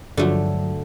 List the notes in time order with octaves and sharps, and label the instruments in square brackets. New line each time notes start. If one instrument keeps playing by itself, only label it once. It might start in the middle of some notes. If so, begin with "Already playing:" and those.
[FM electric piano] G2 F3 F#3 [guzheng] D3 A3